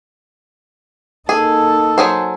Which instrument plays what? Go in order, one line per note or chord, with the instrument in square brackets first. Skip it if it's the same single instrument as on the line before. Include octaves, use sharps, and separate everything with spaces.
[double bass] A#3 D#4 [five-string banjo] G#4 [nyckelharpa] A4
[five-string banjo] F#3 G#4 C5